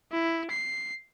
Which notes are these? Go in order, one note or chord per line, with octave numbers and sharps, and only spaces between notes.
E4
C7